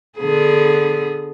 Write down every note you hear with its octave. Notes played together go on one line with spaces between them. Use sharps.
D3 B3 G#4